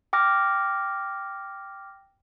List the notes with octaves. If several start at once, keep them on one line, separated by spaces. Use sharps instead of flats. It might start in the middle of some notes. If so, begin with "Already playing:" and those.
G5 D6 F6 A#6